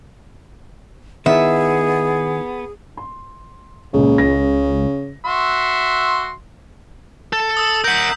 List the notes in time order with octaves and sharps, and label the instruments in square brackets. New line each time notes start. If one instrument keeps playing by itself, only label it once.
[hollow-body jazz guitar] D#3 E4 [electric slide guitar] B3 [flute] G#4 [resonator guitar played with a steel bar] E5
[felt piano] C6
[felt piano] C#2 A#2 [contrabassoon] C#3
[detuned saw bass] C#2 [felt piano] A#6
[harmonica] F#4 E5 C6
[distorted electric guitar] A4
[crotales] D#6 E6
[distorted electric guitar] A#4 F#5 [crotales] G6 B6